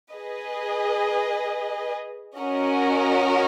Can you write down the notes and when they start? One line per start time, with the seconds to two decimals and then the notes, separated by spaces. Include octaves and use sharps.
0.12 G#4 B4 D#5
2.39 C#4 F#4 A#4 D#5 F#5